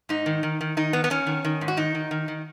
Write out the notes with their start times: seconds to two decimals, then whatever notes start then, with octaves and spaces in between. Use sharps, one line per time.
0.09 G#2 D#4
0.26 D#3
0.43 D#3
0.61 D#3
0.77 D#3 D#4
0.93 D#3 B3
1.04 B3
1.10 D#3 C#4
1.27 D#3
1.44 D#3
1.61 G#2
1.68 F#4
1.77 D#3 D#4
1.95 D#3
2.11 D#3
2.28 D#3